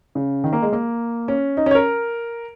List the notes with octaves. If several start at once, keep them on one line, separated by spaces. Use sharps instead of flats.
C#3
D#3
A#3
G#3
A#3
C#4
D#4
C#4 C#5
A#4